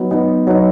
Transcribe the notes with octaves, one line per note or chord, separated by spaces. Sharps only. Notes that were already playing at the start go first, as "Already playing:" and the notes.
Already playing: F#3 B3 D#4
F#3 B3 D#4
F#3 B3 D#4